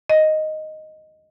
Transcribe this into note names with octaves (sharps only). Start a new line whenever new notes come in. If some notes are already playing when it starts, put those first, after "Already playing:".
D#5